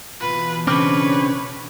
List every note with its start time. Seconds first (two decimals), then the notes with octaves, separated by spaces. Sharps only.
0.19 B2 E3 F4 B4
0.67 C#3 C4 D4 B4 C#5 D6 F6